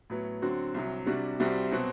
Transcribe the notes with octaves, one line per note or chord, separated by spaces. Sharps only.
A2 F#3 B3
D3 F#3 C4 F#4
C2 C3 F#3
C3 G3 D4 F#4
C2 C3 G3 C4 F#4
B2 F#3 C4 F#4